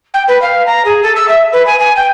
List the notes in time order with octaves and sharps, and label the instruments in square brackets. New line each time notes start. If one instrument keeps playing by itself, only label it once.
[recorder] G5
B4
F5
A#5
G#4
A4
E6
E5
B4
G#5
G#5
G5